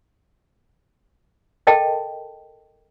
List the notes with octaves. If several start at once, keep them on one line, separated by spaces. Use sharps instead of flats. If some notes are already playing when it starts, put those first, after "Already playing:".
A4 A#4 D#5 G5 A5